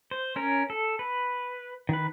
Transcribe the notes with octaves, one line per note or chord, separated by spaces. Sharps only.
C5
C#4 A#4
A4
B4
D#3 B4